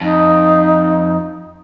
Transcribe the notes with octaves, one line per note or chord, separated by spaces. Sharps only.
F2 D#4